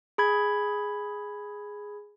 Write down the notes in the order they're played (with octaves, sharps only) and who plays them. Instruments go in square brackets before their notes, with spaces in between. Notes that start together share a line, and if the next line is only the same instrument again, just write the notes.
[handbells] G#4 B5 G#6